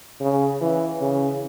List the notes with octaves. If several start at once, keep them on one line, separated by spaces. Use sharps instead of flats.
C#3
E3
C#3